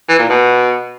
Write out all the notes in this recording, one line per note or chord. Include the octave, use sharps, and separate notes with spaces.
E3
A#2
B2